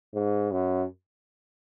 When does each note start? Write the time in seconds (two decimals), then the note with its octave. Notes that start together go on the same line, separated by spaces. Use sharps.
0.14 G#2
0.51 F#2